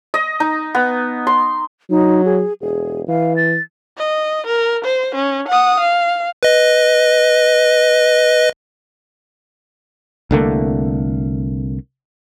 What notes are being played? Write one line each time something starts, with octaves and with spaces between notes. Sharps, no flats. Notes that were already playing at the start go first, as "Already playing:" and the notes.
D#5
D#4
B3
C6
F#3 D#4
G#4
E1 G#4
E3 F5
A6
D#5
A#4
C5
C#4
F#5 D#6
F5
B4 D#5
C2 D3 A3 A#3